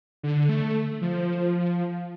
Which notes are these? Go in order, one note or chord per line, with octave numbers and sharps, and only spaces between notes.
D3
A3
F3